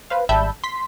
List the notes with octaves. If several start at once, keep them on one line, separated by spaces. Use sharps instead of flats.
B4 C5 F5
G#1 G3 E5 A5 B5 G6
C6 B6